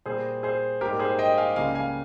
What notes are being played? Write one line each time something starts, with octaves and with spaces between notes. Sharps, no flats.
A#2 G3 A#3 G#4 C5
G#4 C5
G#2 G3 A#3 G4 A#4
G#4 C5
D#5 G5
F5 G#5
C#2 C#3 G3 A#3 F5 G#5
F5 G#5